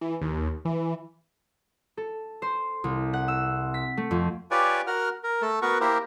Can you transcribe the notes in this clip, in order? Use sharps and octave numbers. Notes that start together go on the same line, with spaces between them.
E3
D#2
E3
A4
C5
C2
F#5
E6
B6
A3
F2
F4 G4 B4 C#5 D5 G#5
F#4 A#4 F#5 F6
A#4
A3 A4
B3 F#4 A#4 B4 C#6
A#3 E4 G4 A#4 C5